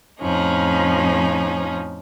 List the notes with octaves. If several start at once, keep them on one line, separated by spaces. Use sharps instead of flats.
F2 A2 F3 C#4 D#4